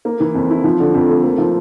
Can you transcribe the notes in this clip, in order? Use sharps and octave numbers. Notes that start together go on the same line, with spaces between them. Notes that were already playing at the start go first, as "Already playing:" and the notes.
A#3
E3
F2
E4
F3
D3
F2
A3
A#3
F3